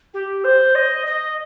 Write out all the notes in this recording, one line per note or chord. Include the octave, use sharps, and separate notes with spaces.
G4
C5
D#5
D#5